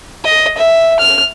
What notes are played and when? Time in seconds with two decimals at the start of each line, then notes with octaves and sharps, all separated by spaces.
0.24 D#5
0.57 E5
1.00 F6